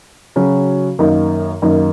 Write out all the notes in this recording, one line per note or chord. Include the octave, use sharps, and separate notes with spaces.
C#3 F#3 C#4 F#4
F#2 D#3 A#3 D#4
F#2 D#3 A#3 D#4